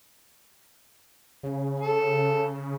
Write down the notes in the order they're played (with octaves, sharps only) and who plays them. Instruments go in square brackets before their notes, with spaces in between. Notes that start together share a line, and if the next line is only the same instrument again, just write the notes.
[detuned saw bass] C#3
[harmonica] A4